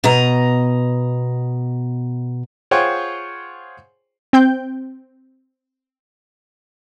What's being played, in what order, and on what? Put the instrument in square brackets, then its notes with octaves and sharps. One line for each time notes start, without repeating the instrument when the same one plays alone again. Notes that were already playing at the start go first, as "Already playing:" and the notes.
[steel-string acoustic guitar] B2 D#5 A#5
[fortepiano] F4 G#4 C5 C#5 F#5 G5
[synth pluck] C4 G5 G6